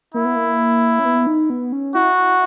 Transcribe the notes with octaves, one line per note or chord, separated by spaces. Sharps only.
A#3 E4
B3
A#3
C#4
B3
D#4
B3
C#4
E4 F#4